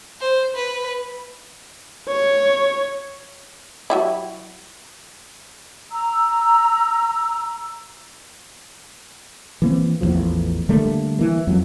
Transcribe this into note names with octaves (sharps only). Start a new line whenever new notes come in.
C5
B4
C#5
F#3 G3 E4
A#5 E6
E3 A#3 C4
A1 E2 G#2 F3
D3 G3 A3 A#3
E3 A#3
F2 F#3